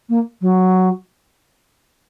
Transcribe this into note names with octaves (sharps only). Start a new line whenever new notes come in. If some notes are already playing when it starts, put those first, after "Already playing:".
A#3
F#3